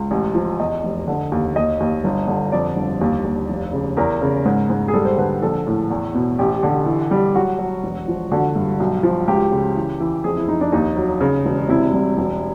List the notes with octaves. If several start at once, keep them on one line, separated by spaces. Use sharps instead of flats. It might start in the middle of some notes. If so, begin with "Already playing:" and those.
Already playing: C#2
A1
F3
E2 D#5
F1
D3
D#2
D#2 D#5
D#2
G1
D3
F2 D5
G1
D#2
D#2
F1
C#3
E2 A#4
C#3
G#2
G#2
G#4
G3 A4
C5
D3 B4
A#1 A4
A2
E2
B2
A1 G4
D3
E3
G3
F#3 F#4
F#3
E1
F3
D3 F#4
G2
B1
F3
C#2 G4
C#3
E3
E3
F2 G#4
E4
F2 D#4
D4
D#2 D#4
F#3
C#3
E1
C3 E4
C2
E1